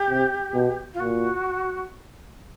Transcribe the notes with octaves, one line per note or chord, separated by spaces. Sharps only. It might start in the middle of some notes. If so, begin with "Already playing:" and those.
Already playing: G4
C3
B2
F4
A#2 F#4